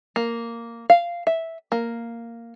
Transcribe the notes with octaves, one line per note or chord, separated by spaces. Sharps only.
A#3
F5
E5
A#3